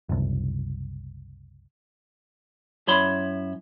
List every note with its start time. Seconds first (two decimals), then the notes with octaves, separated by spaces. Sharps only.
0.09 F#1 C2
2.88 F#2 E4 C#5 B5 C6